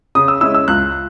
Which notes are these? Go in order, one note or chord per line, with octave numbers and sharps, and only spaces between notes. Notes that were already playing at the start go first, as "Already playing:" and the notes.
C#3 D#6
E6
G#3 C#4 E4 E6
E6
C#2 F#6